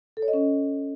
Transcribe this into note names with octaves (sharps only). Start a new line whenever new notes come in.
A4
C#5
D#5
C#4